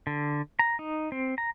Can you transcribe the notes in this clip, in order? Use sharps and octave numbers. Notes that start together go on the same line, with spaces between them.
D3
A#5
D#4
C4
A#5